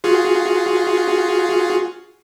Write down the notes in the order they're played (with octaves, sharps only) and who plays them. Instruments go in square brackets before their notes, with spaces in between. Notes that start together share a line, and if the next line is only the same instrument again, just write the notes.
[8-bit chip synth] F4 F#4 G#4